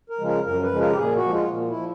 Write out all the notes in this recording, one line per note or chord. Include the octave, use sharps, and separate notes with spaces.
A#4
C#3 F3 G#3
A#4
F#2 A#4
B4
C#3 F3 G#3
A#4
G4
A#2 G#4
F#4
F3 G#3
F4
A#2
E4
F3